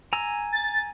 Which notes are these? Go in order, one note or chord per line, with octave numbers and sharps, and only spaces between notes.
G#5 A#5 E6
A6